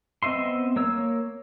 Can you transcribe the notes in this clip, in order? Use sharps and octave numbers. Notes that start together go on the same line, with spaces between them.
B3 C4 D#5 E5 C6
A#3 C#5 E6